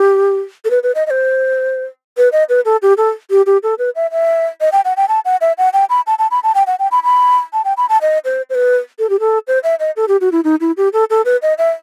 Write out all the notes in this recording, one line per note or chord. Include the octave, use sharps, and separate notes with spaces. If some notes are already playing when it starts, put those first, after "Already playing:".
Already playing: G4
A4
B4
B4
D#5
D#5
C5
B4
D#5
B4
A4
G4
A4
G4
G4
A4
B4
E5
E5
D#5
G5
F#5
G5
A5
F#5
E5
F#5
G5
B5
A5
A5
B5
A5
G5
F#5
G5
B5
B5
A5
G5
B5
A5
D#5
C5
C5
B4
A4
G4
A4
C5
E5
D#5
A4
G4
F#4
E4
D#4
E4
G4
A4
A4
B4
D#5
E5